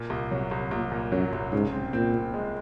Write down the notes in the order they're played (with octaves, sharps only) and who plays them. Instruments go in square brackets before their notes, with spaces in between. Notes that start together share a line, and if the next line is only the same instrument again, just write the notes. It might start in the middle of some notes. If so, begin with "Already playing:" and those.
Already playing: [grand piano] A#2
C2
[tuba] C3 [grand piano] F#3
[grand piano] C2
[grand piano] C2 [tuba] A#2
[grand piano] A#2
[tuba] F#2 [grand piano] F#3
[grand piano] C2
[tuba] G#2 [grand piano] C#3
[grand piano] C4
[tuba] A#2 [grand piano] C4
[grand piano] C4
G#3